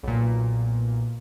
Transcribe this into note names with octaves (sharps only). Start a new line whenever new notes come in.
B1 A#2